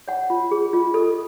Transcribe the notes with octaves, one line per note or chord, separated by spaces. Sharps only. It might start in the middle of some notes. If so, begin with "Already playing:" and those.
C#5 F#5
F4
G#4
F4
A4